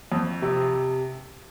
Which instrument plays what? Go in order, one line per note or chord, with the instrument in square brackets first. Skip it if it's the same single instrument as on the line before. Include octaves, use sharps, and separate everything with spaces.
[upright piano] F2
C3